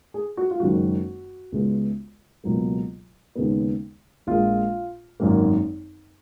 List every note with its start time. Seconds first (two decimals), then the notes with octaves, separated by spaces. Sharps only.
0.14 G#4
0.37 F#4
0.51 F4
0.60 F#1 F#2 D#3 G#3 F#4
1.52 C#2 C#3 G#3 B3
2.44 C#2 B2 F#3 A#3
3.35 D#2 C#3 G#3 B3
4.27 A#1 A#2 G#3 F4
5.20 G#1 F#2 D#3 A#3